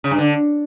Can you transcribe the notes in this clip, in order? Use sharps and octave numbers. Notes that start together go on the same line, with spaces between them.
C#3
G2
D3